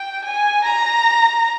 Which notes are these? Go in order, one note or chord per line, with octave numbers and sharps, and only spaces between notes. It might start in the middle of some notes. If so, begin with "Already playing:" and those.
Already playing: G5
G#5
A#5